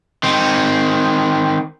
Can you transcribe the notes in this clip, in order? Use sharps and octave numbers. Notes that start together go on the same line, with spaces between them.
D#3 C4